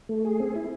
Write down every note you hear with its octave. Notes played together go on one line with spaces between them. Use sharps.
A3
G#4
C4
E4